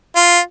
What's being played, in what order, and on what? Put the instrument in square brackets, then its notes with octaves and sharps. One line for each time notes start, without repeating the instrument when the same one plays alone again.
[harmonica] F4